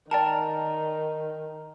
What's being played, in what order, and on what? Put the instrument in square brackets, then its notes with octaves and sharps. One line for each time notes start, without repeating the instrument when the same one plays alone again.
[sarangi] D#3 [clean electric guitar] A#4 [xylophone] D5 G5 A5